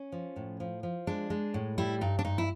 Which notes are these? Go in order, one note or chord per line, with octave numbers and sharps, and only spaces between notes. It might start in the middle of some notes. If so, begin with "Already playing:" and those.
Already playing: C#4
F3
A2
F3
F3
G#3 D4
G#3
A2
G3 E4
G2 D#4
D4
G2 D#4
E4